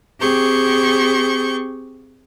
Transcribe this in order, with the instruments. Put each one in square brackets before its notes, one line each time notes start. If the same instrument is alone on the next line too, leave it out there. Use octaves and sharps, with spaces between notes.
[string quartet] C4 G4 G#4 C#6 G6